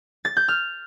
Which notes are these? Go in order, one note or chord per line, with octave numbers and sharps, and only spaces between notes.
A6
G6
F6